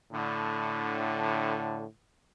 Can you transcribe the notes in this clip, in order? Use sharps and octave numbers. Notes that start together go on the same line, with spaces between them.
A2 D3